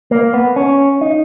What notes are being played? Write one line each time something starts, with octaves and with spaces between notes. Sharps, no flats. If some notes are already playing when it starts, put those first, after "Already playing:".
A#3
B3
C#4
D#4